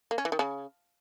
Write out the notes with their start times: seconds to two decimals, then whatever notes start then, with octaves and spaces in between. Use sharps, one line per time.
0.11 A#3
0.18 C#4
0.25 E3
0.32 D#3
0.39 C#3